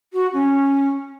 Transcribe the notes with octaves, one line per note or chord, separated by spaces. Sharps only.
F#4
C#4